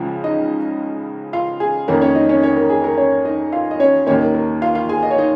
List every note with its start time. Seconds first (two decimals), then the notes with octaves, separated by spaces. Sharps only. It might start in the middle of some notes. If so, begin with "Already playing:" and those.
Already playing: C#2 C#3 F3
0.24 D#4 D#5
1.33 F4 F5
1.60 G#4
1.88 F2 D#3 A#3 C#4 A#4
2.02 C#4 C#5
2.15 D#4 D#5
2.29 C#4 C#5
2.43 C#4 C#5
2.57 A#4
2.70 G#4
2.84 A#4
2.97 C#4 C#5
3.25 D#4 D#5
3.52 F4 F5
3.71 D#5
3.80 C#4 C#5
4.07 D#2 D#3 A#3 C#4 C#5
4.20 A#4
4.34 A#4
4.62 F4 F5
4.75 F4 F5
4.89 G#4 G#5
5.03 D#5
5.11 C#5
5.18 D#4 D#5